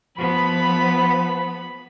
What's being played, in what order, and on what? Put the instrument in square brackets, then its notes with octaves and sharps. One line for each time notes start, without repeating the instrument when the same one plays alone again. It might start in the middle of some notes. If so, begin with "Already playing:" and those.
[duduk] F3 [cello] B3 [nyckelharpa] B5